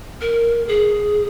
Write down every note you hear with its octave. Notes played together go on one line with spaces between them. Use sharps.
A#4
G#4